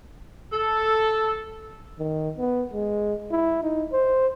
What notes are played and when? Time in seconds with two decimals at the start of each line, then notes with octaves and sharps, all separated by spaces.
0.52 A4
1.99 D#3
2.37 B3
2.73 G#3
3.31 E4
3.63 D#4
3.93 C5